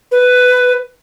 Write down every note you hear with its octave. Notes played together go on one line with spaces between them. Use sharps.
B4